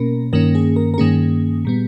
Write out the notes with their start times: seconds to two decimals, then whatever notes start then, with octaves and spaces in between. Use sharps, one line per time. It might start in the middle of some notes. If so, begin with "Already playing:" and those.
Already playing: B2 A#3 C#4 A#4
0.33 G2 D#3 A#3 C#4 A#4
0.55 G#4
0.76 A#4
0.94 A#4
0.98 G2 D#3 A#3 C#4 G#4
1.65 A#2 G3 B3